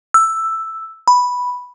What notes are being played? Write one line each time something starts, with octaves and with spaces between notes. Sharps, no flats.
E6
B5